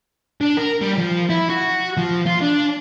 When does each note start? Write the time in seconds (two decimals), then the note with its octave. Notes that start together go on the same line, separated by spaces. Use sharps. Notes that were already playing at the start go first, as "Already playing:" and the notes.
0.41 D4
0.57 A#4
0.81 G3
0.98 F3
1.30 E4
1.50 F#4
1.97 F3
2.27 F4
2.42 D4